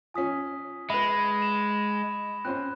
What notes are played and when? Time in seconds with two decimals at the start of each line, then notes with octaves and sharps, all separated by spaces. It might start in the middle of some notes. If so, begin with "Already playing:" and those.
0.14 F3 C#4 G#5 D#6 B6
0.90 G#3 B4 E5 B5 A#6
1.42 E7
2.45 C4 C#4 C5 F#6